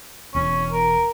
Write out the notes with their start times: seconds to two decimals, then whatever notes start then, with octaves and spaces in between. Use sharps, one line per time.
0.35 E1 E2 C#4
0.72 A#4